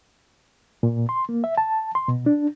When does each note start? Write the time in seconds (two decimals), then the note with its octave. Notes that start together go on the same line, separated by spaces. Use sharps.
0.83 A#2
1.09 C6
1.29 A#3
1.44 E5
1.57 A5
1.95 C6
2.08 B2
2.26 D4